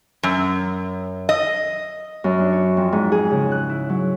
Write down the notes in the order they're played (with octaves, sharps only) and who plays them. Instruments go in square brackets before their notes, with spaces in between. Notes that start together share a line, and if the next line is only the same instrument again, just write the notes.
[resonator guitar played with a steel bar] F#2
D#5
[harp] F#2
D4
C#5
F2
G#2
G#4
C#3
F#6
E4
F#3